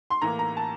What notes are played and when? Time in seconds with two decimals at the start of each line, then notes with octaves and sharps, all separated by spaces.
0.10 C6
0.21 A2 E3 A#3 A#5
0.39 A#5
0.57 A5